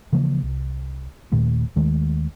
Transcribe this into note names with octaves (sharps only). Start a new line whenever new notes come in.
C#3 E3 F3 A#3
C2
D#1 A#2 D#3 A3
D#2 D#3 G#3 A3